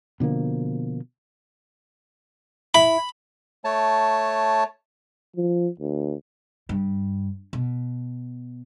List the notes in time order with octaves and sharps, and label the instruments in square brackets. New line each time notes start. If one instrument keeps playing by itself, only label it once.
[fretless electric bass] B2 D3 F3 A#3
[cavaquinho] E4 [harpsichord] B5
[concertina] A3 C#5 A5
[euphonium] F3
D2
[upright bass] G2
B2